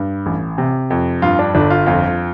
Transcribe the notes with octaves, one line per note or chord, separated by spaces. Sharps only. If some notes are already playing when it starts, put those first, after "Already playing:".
Already playing: G2
A1
C3
F2
G2 F4
D4
G1 D4
F4
F2 F4